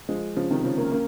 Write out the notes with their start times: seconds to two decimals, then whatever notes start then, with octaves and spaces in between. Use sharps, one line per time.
0.09 F3 G#3
0.36 C#3 F3
0.50 C3 D#3
0.64 C#3 F3
0.78 A#3 C#4
0.92 A#3 C#4